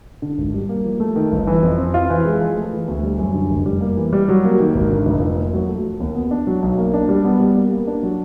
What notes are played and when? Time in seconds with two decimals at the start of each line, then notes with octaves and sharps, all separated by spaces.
0.22 D3
0.38 G#1
0.54 G3
0.69 A#3
0.85 F3
1.00 A3
1.16 D#3
1.32 G1
1.47 E3
1.63 F2
1.78 C4
1.94 F4
2.10 E3
2.25 G#3
2.41 F3
2.57 A3
2.72 E3
2.88 D2
3.04 G3
3.18 F#2
3.34 D3
3.50 F1
3.66 G3
3.81 A#3
3.97 E3
4.13 G3
4.29 F#3
4.44 A#3
4.60 D#3
4.74 G#1
4.90 D3
5.06 F1
5.21 F3
5.37 A#3
5.53 F#3
5.68 A3
5.84 F3
6.00 D#2
6.15 B3
6.31 D4
6.47 F#3
6.62 B1
6.78 A#3
6.94 D4
7.09 G3
7.25 B3
7.40 G3
7.56 A#3
7.71 A#3
7.87 D4
8.03 F#3